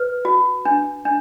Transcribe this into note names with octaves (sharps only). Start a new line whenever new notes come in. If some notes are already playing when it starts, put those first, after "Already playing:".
Already playing: B4
F#4
D4
D4